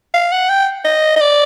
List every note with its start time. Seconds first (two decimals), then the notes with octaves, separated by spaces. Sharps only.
0.14 F5
0.32 F#5
0.49 G5
0.85 D#5
1.16 D#5
1.21 D5